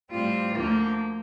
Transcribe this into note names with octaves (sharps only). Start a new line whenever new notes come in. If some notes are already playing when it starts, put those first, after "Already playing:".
A2 G3 C4 F4
D2 D3 F3 A#3